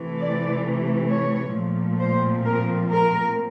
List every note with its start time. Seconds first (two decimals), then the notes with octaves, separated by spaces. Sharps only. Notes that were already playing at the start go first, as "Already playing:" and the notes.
Already playing: C3 E3 A3
0.20 D5
1.10 C#5
1.55 A#2 F3 A3 C4
2.00 C5
2.45 A#4
2.90 A#4